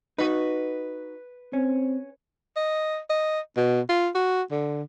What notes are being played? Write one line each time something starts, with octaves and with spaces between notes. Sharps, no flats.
D#4 F#4 B4
C4 C#4
D#5
D#5
B2
F4
F#4
D3